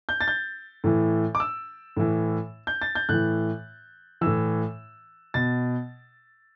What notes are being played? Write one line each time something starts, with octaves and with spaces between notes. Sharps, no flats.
G6
A6
G6
A2 E3
D6
E6
A2 E3
G6
A6
G6
A2 E3 F#6
A2 E3 E6
B2 A6